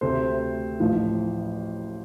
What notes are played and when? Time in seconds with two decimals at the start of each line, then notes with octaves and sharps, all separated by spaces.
0.01 D2 C3 A3 C4 C5
0.80 A1 A2 F3